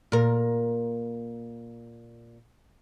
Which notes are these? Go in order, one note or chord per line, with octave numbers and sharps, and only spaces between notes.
A#2 A#4